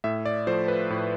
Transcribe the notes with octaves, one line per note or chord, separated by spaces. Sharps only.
A2 E5
D5
F3 A3 C5
B4
A2